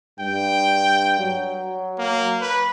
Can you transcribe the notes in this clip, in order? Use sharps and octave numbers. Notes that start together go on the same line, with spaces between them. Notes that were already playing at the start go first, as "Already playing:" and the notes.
G2 G5
F#3
A#3
B4